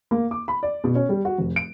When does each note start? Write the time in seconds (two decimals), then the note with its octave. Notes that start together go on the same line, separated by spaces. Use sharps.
0.11 A#3
0.31 D6
0.48 B5
0.63 D5
0.84 B2
0.95 C#4
1.09 G3
1.25 F#4
1.38 F1
1.56 D7